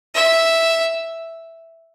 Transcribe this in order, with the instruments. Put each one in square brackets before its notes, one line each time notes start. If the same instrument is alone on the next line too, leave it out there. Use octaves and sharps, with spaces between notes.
[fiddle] E5